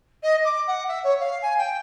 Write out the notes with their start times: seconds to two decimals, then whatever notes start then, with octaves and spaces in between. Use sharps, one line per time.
0.23 D#5
0.44 D6
0.67 F#5
0.88 E5
1.04 C#5
1.20 F5
1.42 G#5
1.58 G5